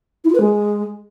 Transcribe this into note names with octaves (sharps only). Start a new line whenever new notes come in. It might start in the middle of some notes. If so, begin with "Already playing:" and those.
E4
F4
B4
G#3